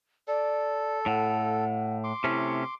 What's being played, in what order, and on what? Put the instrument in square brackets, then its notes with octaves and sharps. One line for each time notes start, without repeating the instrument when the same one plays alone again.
[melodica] A4 [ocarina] D5
[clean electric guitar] A2 [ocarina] F#5
[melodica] C6 D6
[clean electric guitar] C3 A3 C#4 [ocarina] E4